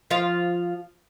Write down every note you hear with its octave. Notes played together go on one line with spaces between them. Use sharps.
F3 F4 F5